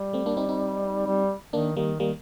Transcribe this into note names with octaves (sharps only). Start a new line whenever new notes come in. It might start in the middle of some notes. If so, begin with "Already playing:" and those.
Already playing: G3
A3 C4
A#3 D4
C4 D#4
C4 D#4
G3
D#3 A#3 D4
D#3 G3 A#3
D#3 G3 A#3